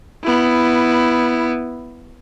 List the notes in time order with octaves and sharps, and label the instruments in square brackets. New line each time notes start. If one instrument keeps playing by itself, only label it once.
[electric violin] B3 E4